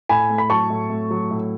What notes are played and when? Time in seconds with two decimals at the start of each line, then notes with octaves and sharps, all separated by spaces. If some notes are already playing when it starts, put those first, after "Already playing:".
0.09 A2 G#5 B5
0.30 A3
0.38 B5
0.50 F#3 A5 C#6
0.70 A2
0.90 A3
1.10 F#3
1.30 A2